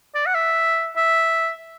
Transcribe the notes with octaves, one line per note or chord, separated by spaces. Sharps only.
D5
F#5
E5
E5